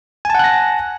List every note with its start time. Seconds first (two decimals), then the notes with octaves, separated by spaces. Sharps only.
0.25 G#5
0.30 A5
0.35 F#5
0.39 F#6
0.44 A#6